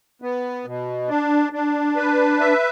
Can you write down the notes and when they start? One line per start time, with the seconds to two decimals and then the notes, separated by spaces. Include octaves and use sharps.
0.22 B3
0.65 B2
1.09 D4
1.53 D4
1.96 B4
2.40 E5